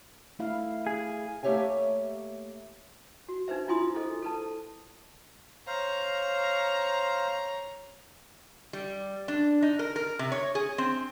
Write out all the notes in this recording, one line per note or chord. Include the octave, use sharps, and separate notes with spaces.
A3 E4 F5
G#4
A3 A#3 G4 C#5 E5 G#5
F#4
D4 D#4 B4 C5 E5
E4 F4 G#5 C6 D#6
E4 G#4 A4 C5 D#5
A4 B4 A5
C5 C#5 F5 A#5
G3
D4
D#4
A#4
A#4
C3
C#5
G#4
C4